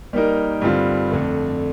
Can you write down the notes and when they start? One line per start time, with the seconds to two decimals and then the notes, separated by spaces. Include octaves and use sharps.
0.13 G3 A#3 D#4 A#4
0.61 G2 D3 G3 C4 F4
1.11 F2 D3 A3